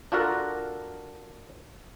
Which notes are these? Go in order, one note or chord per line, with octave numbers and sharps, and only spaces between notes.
D4 F4 F#4 A4 A#4